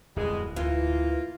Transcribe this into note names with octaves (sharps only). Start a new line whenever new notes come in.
D1 F2 B2 G3 G#3
D2 E3 A#3 F4